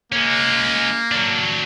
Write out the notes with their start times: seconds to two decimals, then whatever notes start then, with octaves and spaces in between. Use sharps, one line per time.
0.12 G#3 A#3 C#4
1.12 F#3 D4